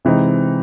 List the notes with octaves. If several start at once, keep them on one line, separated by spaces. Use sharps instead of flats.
C3 E3 G#3 C4 D#4